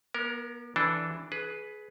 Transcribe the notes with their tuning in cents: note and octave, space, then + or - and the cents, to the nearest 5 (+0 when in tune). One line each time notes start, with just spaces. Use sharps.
B3 -45 A#4 +0
E3 +0 D4 +0 A4 +0
G#4 +25 B4 +0